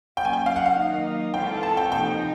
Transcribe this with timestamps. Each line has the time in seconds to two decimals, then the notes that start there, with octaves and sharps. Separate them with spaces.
0.17 F#3 A#3 C#4 G5
0.25 G#5
0.33 G5
0.46 F5
0.56 F#5
0.66 F5
0.75 D#3 F#3 A#3 D#4
1.34 E3 G#3 C4 F4 A4 G5
1.63 A5
1.77 G5
1.92 C3 F3 A#3 D#4 G5